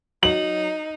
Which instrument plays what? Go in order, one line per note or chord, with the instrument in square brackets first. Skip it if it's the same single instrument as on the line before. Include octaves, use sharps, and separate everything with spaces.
[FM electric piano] F#3 [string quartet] D#4 [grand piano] F#7